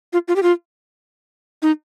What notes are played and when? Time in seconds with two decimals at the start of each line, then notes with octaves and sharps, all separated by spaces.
0.13 F4
0.28 F4
0.36 G4
0.43 F4
1.62 D#4